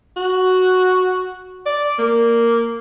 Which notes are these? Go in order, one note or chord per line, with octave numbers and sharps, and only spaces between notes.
F#4
D5
A#3